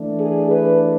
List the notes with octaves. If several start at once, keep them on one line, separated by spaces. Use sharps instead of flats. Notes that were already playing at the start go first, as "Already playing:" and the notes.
Already playing: E3 A3 D4
G#4
B4